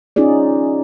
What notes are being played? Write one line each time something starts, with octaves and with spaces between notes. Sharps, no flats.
C#4 D#4 F4 G#4 D5